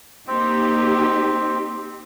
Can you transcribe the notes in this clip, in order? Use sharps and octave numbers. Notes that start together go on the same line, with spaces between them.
A#3 C4 D#4 G4